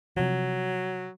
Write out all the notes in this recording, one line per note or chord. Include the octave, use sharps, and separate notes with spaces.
C3 F3 F#3